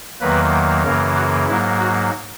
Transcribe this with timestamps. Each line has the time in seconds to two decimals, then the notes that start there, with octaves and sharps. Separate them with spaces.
0.21 E2 D#3 F#3 A#3 B4
0.84 F#2 C#3 E3 A#3 A#4
1.16 F#4
1.47 G#2 F#3 A#3 E4
1.79 F#4